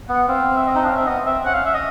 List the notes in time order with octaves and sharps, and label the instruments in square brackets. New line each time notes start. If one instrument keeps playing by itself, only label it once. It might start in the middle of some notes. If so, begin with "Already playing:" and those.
[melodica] B3 [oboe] F#5
[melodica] C4 [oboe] F5
[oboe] E5
D#5
[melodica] D#4
D4
[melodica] C#4 [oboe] F5
[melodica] C4 [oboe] E5
[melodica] B3 [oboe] D#5
[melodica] C4 [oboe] E5
[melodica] C#4 [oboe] F#5
[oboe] F5
E5
D#5